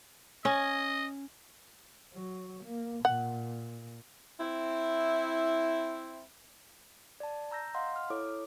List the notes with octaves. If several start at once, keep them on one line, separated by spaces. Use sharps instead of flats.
C#4 D#5
F#3
A#3
A#2 F#5
C4 E4
D5 A5
A#5 E6 G6 A#6
D#5 F5 F#5 C6
F6
E4 A4 C#5 D6